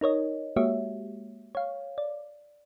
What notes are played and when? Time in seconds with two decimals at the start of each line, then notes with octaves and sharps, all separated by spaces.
0.01 D#4 A#4 C#5 D#5
0.56 G#3 A#3 F#4 G4 C#5 E5
1.55 C#5 F5
1.98 D5